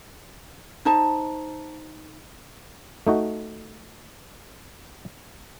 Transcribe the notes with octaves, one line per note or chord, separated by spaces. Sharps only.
D#4 C5 A5
A3 D#4 F#4